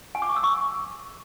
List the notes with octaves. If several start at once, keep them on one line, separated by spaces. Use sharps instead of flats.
G#5
D6
C#6
E6
C#6